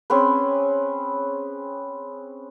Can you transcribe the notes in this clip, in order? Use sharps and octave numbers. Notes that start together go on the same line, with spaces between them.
C4 C#4 G#4 B4